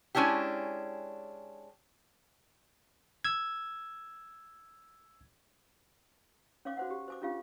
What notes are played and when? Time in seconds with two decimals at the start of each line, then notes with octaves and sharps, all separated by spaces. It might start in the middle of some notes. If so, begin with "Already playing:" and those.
0.15 G#3 C#4 D4 E4 G4
3.25 E6 G#6
6.65 C#4 C#5 F5 D6
6.77 F#4 C5 F#5
6.90 G4
7.08 C5 G#5 D6
7.22 C#4 D4 F4 G4 F5